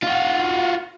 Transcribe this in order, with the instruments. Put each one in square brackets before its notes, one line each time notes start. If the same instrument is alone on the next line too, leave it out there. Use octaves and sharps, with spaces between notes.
[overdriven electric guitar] F4 F#4